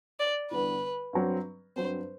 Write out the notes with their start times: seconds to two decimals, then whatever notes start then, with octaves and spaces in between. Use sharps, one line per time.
0.20 D5
0.51 E2 D3 G3 B3 B4
1.13 G2 F#3 C4
1.76 G2 F#3 C4 C5